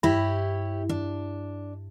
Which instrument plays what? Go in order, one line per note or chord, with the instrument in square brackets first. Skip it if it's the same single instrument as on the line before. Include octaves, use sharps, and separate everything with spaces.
[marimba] G2 [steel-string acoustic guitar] E4 G4 C#5
[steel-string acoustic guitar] D4